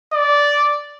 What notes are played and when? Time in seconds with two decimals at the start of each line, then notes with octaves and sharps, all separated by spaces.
0.13 D5